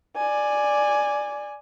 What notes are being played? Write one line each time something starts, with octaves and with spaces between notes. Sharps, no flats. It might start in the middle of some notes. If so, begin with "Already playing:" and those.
D5 G#5